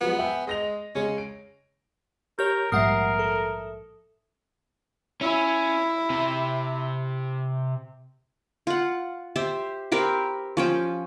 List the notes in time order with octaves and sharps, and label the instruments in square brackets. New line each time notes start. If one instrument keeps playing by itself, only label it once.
[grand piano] F3 F#3 G#3 [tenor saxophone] B3
[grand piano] E5 G5 G#5
[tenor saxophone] G#3 [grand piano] D#5 A#6 F7
[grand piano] C#3 G#3 [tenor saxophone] C#4
[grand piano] D7
[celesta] G4 [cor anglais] A#4 [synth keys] C#5 G6
[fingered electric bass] A#1 G#2 G3 [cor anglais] A#4 [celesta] E5 D#6 [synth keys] F#5 C7
[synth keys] A4
[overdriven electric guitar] C#4 [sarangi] E4
[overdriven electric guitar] C3
[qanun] F4 F#5
G4 C5 E5
C4 G4 A#4 B4
F3 C#4 G5